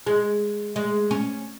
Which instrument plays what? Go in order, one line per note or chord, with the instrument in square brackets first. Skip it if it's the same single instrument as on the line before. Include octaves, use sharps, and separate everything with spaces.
[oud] G#3
G#3
C#4